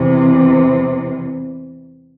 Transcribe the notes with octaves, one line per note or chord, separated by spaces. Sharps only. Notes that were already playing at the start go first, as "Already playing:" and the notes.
Already playing: E2 C3 E3